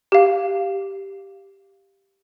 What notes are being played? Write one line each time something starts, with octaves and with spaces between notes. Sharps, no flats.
G4 F5